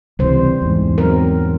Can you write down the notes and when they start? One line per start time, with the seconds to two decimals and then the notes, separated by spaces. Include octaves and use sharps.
0.19 C#2 C3 E3 G3 C5
0.62 E2 G#2
0.98 F#3 C4 A#4